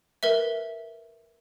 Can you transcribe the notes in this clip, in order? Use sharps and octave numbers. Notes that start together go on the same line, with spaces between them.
A#4 B4 E5